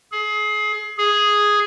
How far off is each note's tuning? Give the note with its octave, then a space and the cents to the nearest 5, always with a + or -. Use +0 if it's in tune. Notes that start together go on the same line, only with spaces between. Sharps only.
G#4 +30
G#4 +0